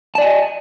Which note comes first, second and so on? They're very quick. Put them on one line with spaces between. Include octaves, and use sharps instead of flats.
A5 D5 G#5 D#5